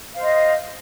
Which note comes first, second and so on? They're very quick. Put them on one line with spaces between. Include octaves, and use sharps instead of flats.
F5 C5 D#5